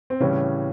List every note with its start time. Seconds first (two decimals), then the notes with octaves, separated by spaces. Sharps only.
0.10 C4
0.20 A2 C#3 E3 G3 C#4